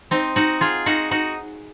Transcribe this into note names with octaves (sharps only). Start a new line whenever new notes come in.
C4 D#4
D#4 F#4
F4 G#4
D#4 F#4
D#4 F#4